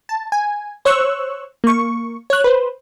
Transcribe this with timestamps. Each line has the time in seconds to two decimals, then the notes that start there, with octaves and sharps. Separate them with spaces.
0.09 A5
0.32 G#5
0.85 C5 C#5 C#6 E6 F#6
1.64 A#3 C#6
2.30 C#5 F#6
2.44 B4 C5